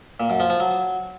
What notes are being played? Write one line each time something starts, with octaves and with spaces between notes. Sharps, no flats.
A#2
F#2
F3
F3
F#3